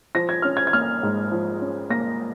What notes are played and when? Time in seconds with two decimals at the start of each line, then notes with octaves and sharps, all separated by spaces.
0.15 F3 A#6
0.29 G#6
0.42 C#4 F6
0.57 G#6
0.67 G#6
0.73 A#3 F6
1.03 G#2
1.32 F3
1.62 C#4
1.90 A#3 A#6